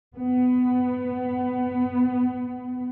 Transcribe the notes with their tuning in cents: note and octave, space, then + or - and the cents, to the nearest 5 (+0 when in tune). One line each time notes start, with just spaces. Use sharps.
B3 +20